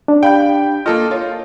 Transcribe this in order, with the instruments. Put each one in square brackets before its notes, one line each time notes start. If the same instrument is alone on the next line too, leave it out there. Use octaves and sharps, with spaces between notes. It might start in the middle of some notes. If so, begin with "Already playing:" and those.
[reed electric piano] D4
[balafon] G4 F5 [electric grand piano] G5 B5 G6
[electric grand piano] A#3 A4 D#5 [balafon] F4 [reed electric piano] F6
[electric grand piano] F4 [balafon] C#5